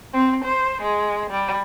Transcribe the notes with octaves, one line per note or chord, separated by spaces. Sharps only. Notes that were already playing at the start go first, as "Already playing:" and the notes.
C4
C5
G#3
G3